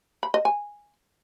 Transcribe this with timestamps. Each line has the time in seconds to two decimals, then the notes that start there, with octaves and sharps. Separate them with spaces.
0.23 B5
0.34 D#5
0.45 G#5